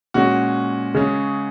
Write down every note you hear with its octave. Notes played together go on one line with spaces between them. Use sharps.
A#2 G#3 C#4 F#4
C#3 G#3 C#4